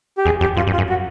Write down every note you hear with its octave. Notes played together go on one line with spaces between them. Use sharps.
G4
E2 G#4
F2 G4
F#2 F4
F#2
F4
F#2
F#4